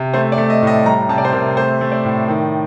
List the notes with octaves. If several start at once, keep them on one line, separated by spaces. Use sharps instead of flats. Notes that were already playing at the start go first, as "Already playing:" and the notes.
Already playing: C3
A3 C5
D5
A3
D#5
A2 D#5
G3 A#5
C3 A5
D5
C5
C3 A#4
A3 C5
A3
D5
A2
D#3